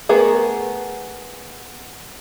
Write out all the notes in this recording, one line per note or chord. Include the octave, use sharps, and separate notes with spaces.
A3 B3 G#4 A#4